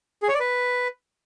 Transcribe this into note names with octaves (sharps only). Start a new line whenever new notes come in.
G#4
C#5
D5
B4